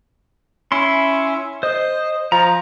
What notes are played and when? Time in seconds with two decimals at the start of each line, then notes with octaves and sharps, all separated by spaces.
0.72 C#4 E4 C6
1.63 C5 D#5
2.32 F3 A#5